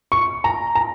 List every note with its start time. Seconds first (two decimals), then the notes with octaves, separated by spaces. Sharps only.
0.12 C#6
0.44 A#5
0.75 A#5